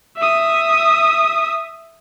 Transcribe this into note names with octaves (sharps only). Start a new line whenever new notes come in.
E5 D#6